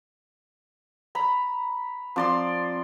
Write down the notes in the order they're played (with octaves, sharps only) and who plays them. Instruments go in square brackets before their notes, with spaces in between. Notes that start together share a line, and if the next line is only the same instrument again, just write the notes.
[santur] A#5 B5
[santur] F3 D5 C6 [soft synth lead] C4